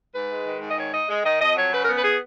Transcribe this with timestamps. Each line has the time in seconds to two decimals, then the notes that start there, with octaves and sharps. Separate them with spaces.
0.13 G#2 B4
0.29 G#3
0.45 D#3
0.61 G#2
0.68 D#5
0.76 D#3 C#5
0.92 D#4 D#5
1.08 G#3
1.24 D#3 D#5
1.39 F2 D#5
1.56 F#3 C#5
1.71 C#3 B4
1.82 A#4
1.88 B3 B4
2.03 G#4